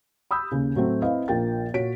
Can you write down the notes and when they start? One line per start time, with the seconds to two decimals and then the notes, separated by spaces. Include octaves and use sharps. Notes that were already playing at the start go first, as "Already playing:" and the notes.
0.31 B5 D#6 E6 G6
0.52 D#2 C#3
0.75 A2 F#3 A3 C4
1.02 C4 E4 B4 D#5 F5
1.28 A#1 F3 A#3 A#4 G5 A6
1.74 A#2 F#4 C#5 B6 D7